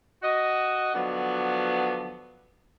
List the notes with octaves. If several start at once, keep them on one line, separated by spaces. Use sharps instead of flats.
F#4 D#5
D3 F3 F#3 B3 D5